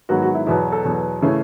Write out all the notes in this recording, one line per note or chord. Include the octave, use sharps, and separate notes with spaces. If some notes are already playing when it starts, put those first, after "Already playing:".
G#2 D#3 F#3 B3 F#4
F#4
E4
E2 B2 F#3 E4
A4
E2 B2 F#3
C#3 E3 A3 C#4